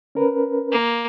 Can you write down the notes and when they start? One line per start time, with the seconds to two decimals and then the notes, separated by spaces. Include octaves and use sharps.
0.15 C#4 A#4 B4
0.71 A#3